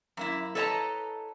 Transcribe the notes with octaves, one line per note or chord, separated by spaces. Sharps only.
F#2 A#3 E4
A4 B4 C#5 D#5 A5 A#5